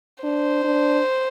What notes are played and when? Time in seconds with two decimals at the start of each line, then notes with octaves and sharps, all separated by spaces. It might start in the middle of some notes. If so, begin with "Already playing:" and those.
0.23 D4 C5
0.64 D4